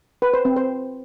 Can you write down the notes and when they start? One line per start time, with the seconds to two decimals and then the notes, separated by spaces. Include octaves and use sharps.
0.22 B4
0.34 C5
0.45 C4
0.56 C5